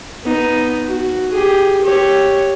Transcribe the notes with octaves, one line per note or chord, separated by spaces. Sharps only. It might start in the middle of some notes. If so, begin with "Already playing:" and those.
B3 D#4
F#4
G4 G#4
G4 C#5